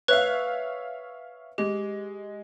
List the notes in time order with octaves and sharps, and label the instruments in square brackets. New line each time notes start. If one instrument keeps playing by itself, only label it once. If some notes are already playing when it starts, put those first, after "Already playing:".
[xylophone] B4 F#6 [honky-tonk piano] C#5 E5 F5
[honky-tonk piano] G#3 [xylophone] G4